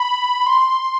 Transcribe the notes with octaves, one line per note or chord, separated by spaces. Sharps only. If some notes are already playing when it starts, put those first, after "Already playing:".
Already playing: B5
C6